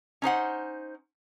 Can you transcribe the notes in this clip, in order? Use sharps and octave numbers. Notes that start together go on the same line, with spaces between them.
C#4 D#4 C5 F#5